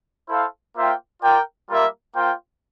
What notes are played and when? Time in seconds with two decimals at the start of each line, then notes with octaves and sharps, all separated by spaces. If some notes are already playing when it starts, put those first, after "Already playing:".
0.29 E4 A4 C5 F5
0.77 A#3 F4 C5 E5 G5
1.23 F4 A#4 D5 G5
1.70 G3 A#3 F4 A#4 E5
2.16 A#3 F4 C5 G5